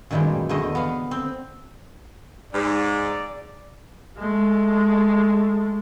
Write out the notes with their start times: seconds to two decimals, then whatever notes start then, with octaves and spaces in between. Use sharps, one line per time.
0.11 F#2 A#2 D#3 E3 G3 G#3
0.49 E2 D3 A3 D#5
0.75 B3 F5
1.11 C4
2.53 G#2 D5
4.18 G#3 A3